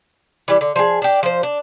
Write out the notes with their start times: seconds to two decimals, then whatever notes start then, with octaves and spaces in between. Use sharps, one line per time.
0.48 E3 G3
0.61 D3
0.76 F3 G#4
1.02 D4 G4
1.23 F3 C5
1.43 D4